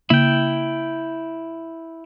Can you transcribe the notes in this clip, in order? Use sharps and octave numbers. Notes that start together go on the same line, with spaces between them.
C#3 A#3 E4 G5